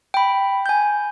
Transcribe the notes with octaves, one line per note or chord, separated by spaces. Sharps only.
G5 B5
G#5 G6